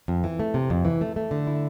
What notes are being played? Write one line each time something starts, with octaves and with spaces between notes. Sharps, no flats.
F2
E3
A3
C3
F2
E3
A3
A3
D3
E4